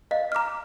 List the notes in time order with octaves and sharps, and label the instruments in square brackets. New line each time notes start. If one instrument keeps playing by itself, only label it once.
[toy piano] D#5 [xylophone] F5
[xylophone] A#5 D6 F6